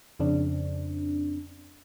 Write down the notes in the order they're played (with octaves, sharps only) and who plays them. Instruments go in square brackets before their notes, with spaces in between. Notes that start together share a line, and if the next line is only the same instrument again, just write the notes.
[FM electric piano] F2 C#3 C4 D4